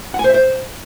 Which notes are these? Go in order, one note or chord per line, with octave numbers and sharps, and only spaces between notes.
F#5
G#5
C5
E5
C5